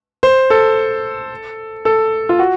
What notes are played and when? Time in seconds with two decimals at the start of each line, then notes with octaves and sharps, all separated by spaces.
0.23 C5
0.50 A4
1.85 A4
2.29 F4
2.39 F#4